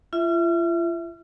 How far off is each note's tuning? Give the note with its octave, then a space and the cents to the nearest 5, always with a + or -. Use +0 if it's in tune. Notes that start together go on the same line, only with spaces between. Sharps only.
F4 -40 E5 +0